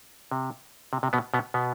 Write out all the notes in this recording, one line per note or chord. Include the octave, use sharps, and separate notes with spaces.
C3
C3
C3
B2 B3
B2 B3
B2 B3